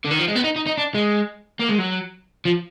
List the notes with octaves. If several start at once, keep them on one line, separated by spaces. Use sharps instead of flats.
D3
D#3
F3
G#3
B3
D#4
D#4
D#4
D4
G#3
A#3
G#3
F#3
F3